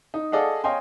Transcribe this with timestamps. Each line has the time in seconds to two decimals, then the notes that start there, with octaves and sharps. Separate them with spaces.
0.14 D#4
0.32 G#4 A4 D5 D#5 F5 F#5
0.64 C#5 D#5 F5 G5 G#5 C6